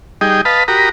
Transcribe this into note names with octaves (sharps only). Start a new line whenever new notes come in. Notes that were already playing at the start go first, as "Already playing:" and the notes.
G3 D#4 G#4 D#5 G5
B4 D#5 F5 A5 B5
F#4 G4 A#4 A#5 B5 D#6